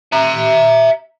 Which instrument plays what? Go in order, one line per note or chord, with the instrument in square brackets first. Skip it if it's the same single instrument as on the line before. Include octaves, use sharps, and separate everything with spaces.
[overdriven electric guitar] E5 A#5